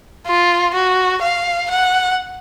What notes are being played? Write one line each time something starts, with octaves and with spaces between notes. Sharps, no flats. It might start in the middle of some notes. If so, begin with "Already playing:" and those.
F4
F#4
F5
F#5